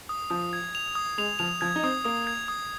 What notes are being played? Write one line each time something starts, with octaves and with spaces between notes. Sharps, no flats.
D#6
F3 D#6
G#6
F7
D#6
G#3 F7
F3 F7
F3 G#6
D#4
C4 D#6
A#3 D#6
G#6
D#6